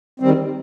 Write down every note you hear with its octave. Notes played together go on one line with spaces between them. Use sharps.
D#3 G3 C4